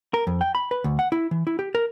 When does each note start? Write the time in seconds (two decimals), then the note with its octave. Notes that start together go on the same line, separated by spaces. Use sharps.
0.14 A#4
0.27 F2
0.41 G5
0.55 B5
0.71 B4
0.84 D2
0.99 F#5
1.12 E4
1.31 E3
1.47 E4
1.59 G4
1.75 A#4